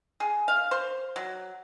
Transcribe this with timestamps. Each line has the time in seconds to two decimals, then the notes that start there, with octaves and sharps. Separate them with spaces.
0.20 G#4
0.48 F5
0.71 C5
1.16 F#3